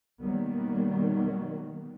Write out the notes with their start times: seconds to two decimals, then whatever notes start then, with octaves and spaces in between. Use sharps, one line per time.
0.22 B2 D#3 F#3 G3 A#3 B3